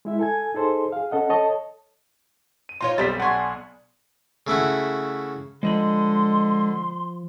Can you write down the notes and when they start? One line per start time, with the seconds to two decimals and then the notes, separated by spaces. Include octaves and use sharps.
0.05 G#3 E4 E5
0.19 A4 G#5 G#6
0.54 D#4 G#4 A4 C5 C6
0.92 G#4 F5
1.11 C#4 A4 D#5 F#5
1.29 A4 C#5 D#5 A5
2.69 D#7
2.81 D#4 F4 C#5 C6
2.98 B1 B2 G3 C4 D5 A6 B6
3.20 D4 F#5 G#5 C6 C#6
4.47 C#3 A3 E4 F#4
5.63 D3 F3 G#3 D#5 B5 C6